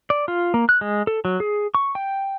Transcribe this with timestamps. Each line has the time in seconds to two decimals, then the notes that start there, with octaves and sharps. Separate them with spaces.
0.10 D5
0.28 F4
0.54 A#3
0.69 F#6
0.81 G#3
1.07 A4
1.25 F#3
1.40 G#4
1.75 C#6
1.95 G5